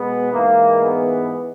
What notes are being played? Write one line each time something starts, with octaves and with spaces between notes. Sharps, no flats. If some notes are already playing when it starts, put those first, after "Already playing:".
Already playing: B2 G#3 B3
G#2 E3 G#3 A#3
B3